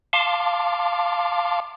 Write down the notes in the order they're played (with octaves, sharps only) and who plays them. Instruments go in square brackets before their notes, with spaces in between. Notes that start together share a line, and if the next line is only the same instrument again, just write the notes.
[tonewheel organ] F5 A5 C6 D6